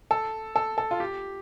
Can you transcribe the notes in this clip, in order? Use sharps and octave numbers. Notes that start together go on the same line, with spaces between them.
A4
A4
A4
F4
G4